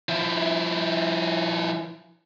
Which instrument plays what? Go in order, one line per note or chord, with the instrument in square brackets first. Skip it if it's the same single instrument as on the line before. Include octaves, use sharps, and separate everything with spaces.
[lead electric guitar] F3 E4